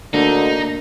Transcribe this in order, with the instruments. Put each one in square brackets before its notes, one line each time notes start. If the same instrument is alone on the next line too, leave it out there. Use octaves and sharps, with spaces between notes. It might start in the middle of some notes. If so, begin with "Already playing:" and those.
[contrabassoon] D2 [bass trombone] D3 [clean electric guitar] A#3 D4 [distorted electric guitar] D#4